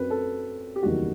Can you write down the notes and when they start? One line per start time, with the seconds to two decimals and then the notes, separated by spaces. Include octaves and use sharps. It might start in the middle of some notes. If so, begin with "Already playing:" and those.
Already playing: F#2 F#3 C4 B4
0.10 A4
0.76 G4
0.83 F#1 E2 D#3 G3 F#4